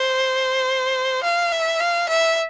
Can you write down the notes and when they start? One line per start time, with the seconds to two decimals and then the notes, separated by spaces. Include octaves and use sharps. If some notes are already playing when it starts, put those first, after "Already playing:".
Already playing: C5
1.23 F5
1.52 E5
1.80 F5
2.09 E5